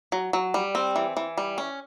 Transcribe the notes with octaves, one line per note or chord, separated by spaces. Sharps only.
F#3
F#3
G3
C4
E3
E3
G3
C#4